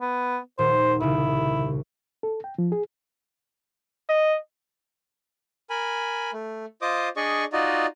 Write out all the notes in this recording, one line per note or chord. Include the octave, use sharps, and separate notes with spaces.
B3
D#1 C5
C2 C#3 E4
A4
G5
F3
G#4
D#5
A#4 G#5 B5
A3
F4 C5 D#5 D6 D#6
D4 G#4 D5 D#5 C#6
D#4 F4 F#4 D5 D#5